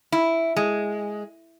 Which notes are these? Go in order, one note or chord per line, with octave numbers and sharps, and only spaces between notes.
E4
G#3